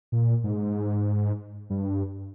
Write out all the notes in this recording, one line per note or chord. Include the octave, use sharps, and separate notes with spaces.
A#2
G#2
G2